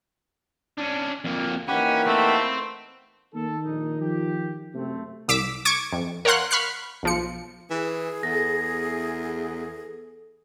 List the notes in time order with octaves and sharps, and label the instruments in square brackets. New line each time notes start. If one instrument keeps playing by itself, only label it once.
[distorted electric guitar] C#4 D4
F2 A#3
[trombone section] E3 A#3 D#4 [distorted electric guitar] C#4 [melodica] G4 F#5 B5
[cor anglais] A3 [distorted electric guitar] C4
[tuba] D#3 [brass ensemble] A#3 A4
[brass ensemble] A#1 D#4
F3 G4
[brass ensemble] F#2 A3 C4 [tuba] C3
[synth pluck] C2 D6 E6 B6 D7
C#6 D6 G#6 D7
F2
A#4 C#5 F5 F#5 C6 F#6
B5 C#6 F6 F#6 C7
B1 F3 C#7
[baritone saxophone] E3 [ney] G#4
[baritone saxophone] E2 [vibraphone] A4 [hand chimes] A#6